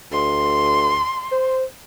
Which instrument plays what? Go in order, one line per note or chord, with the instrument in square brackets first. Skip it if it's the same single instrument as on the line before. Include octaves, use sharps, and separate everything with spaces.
[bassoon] D2 [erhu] C6
[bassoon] C5